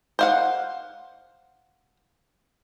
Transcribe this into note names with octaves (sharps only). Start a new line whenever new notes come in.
C5 F5 F#5